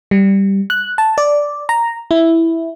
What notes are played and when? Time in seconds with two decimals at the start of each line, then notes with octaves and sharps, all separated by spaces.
0.11 G3
0.70 F#6
0.98 A5
1.18 D5
1.69 A#5
2.11 E4